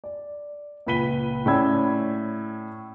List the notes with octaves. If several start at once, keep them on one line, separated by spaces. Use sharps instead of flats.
D5
C#2 A#2 B4 B6 D#7 G7
A2 C#4 D5 B5 E6 G#6